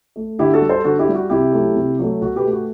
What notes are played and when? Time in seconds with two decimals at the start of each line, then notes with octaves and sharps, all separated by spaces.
0.16 A3
0.39 D3 E4 G4
0.53 F#4 A4
0.61 G3
0.69 A4 C5
0.84 D3 F#4 A4
0.99 E4 G4
1.08 G3
1.15 F#4
1.30 C3 E4 G4
1.53 F#3 A3
1.75 C3
1.99 F#3 A3
2.21 B2 F#4 A4
2.36 G4 B4
2.45 A3
2.53 F#4